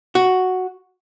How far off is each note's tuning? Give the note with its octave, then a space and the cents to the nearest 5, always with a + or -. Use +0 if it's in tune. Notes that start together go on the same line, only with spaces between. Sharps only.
F#4 +0